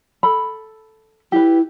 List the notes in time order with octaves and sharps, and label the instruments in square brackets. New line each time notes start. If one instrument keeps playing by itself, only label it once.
[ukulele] A4 B5
[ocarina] E4 [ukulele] G4 B4